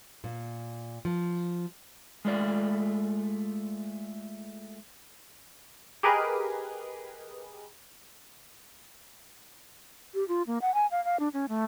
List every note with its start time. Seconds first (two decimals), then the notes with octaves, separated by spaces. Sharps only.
0.24 A#2
1.05 F3
2.25 G#3 A3 F4 D5
6.03 G4 G#4 A#4 B4 D#5
10.14 G4
10.28 F4
10.47 A#3
10.62 F#5
10.74 G#5
10.91 F5
11.05 F5
11.20 D4
11.33 C#4
11.49 A3